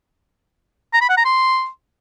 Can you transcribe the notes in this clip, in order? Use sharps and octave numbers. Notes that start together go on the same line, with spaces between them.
A#5
B5
F#5
A#5
C6